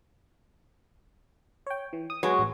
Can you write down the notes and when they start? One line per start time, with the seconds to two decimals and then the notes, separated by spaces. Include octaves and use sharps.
1.67 C#5 G5
1.93 E3
2.10 D#6
2.23 F#3 G#3 B3 G#5
2.39 A1